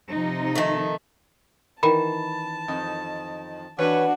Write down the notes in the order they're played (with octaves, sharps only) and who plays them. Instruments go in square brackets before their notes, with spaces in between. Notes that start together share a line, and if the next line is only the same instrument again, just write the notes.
[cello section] C3 F3 D#4
[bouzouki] D#3 A3
[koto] D#3 E3 [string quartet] A5 [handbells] B5
[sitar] F2 D#4
[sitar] E3 B4 C#5 [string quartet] D4 F#4 F#5